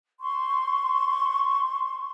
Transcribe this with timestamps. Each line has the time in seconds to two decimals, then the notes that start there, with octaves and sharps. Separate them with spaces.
0.21 C6 C#6